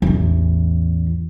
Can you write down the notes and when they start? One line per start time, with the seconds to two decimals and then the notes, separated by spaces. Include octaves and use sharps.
0.02 A1 E2